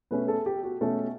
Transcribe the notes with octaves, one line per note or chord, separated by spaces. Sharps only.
B2 A3 C#4 B4
A4
G4
F#4
B2 A3 C#4 A4